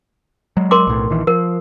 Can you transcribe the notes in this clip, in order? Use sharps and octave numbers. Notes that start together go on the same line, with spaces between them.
F#3 G#3
A#4 C6 D6
B1 A2
A#1 D#3 E3
F3 A#4